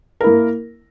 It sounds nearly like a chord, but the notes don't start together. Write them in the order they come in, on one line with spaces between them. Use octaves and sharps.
A#4 E4 A#3